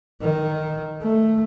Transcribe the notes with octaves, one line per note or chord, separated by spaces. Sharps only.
D#3
A3